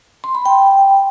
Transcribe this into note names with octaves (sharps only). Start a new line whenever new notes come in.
C6
B5
G5